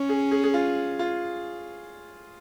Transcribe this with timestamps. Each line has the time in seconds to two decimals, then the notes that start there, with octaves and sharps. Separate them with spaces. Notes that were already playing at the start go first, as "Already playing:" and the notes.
Already playing: C#4 C#5
0.09 G#4
0.31 G#4
0.43 G#4
0.54 F4
0.99 F4